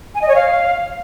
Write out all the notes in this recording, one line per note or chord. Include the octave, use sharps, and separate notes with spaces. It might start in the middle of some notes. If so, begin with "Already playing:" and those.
G#5
D#5
C#5
F5